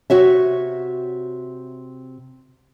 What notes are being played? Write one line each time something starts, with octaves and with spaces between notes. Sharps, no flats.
C3 F#4 C#5 E5